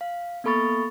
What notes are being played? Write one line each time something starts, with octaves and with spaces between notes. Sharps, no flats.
F5
A#3 B3 A4 B5 C#6 A6